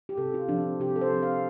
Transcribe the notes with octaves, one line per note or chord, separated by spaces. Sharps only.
G4
C3 A4
F4
F3 C4 D4
C3 G4
A4
C5
F3 C4
F5